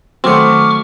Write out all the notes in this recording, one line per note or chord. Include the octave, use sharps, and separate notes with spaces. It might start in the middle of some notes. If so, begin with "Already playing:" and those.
D#3 F#3 A3 C4 C#6 D6 F6